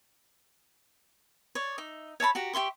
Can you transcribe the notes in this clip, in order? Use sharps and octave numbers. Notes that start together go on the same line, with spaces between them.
C#5 D5
D#4 E5
C#5 E5 A5 B5
F#4 G4 A#5
G4 E5 C6 C#6